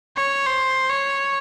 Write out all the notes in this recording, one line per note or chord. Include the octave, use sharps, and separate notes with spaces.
C#5
C5
C#5